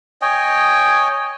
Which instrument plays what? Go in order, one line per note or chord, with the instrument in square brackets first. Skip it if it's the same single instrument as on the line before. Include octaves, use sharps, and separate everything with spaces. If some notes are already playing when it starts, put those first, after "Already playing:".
[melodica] C#5 D#5 G5 G#5